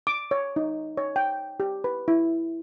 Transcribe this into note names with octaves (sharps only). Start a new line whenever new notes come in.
D6
C#5
D#4
C#5
G5
G4
B4
E4